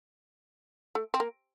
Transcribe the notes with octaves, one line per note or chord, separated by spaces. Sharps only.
A3
C4
A#3